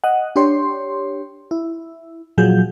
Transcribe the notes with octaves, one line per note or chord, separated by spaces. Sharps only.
D#5 F#5
D4 G4 C#5 C6
E4
A#2 F3 F#3 G#4 G6